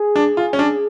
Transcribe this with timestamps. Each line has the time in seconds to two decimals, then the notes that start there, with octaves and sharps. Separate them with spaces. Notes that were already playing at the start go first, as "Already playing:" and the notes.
Already playing: G#4
0.16 D4
0.37 F4
0.53 C#4
0.59 D4